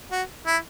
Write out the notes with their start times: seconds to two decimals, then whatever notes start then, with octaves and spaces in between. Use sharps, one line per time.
0.11 F#4
0.46 E4